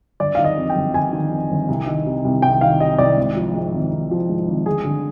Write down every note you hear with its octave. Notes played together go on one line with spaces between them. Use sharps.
G1 D5
D#3 F5
D#5
F2
G5
G1
G1 G#5
D#3
F2
G1
C2
D#3
C3
C2
C2 G5
D#3 F5
C3 D#5
C2 D5
G#1
F3
G#2
G#1
G#1
F3
G#2
G#1
G1 G#4
D3